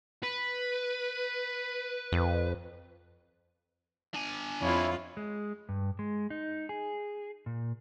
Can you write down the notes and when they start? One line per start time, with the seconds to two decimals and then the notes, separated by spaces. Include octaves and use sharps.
0.23 B4
2.12 F2
4.14 D4 G#5
4.62 F2 E4 F4 C#5
5.17 G#3
5.69 G2
5.99 G#3
6.30 D#4
6.69 G#4
7.46 A#2